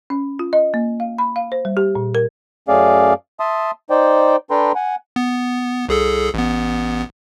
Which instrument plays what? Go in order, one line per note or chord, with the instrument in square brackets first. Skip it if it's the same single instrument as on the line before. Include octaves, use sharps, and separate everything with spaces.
[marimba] C#4
F4
D#5
A#3
F5
B5
F5
C5
G3
G4
A#2
A#4
[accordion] F#2 A3 C#4 G#4 D5 F5
E5 A5 C6 D#6
D#4 C5 D5 G5
D4 A4 B4 G5 A#5 C6
F#5 G#5
[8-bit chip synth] B3
C2 G#4 A4
A1 B3